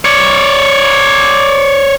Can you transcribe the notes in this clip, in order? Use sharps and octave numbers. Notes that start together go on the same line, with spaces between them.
C#5 D5